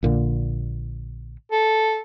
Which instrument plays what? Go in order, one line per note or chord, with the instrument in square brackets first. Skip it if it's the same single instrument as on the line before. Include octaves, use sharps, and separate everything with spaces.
[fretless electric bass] A#1 A#2 D3
[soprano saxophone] A4